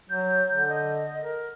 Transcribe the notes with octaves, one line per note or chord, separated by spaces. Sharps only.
F#3 G6
D3
D#5
A#4